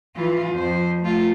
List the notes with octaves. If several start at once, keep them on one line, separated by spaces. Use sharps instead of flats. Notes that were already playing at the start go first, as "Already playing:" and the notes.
E3 F4
F2 C5
A3 F4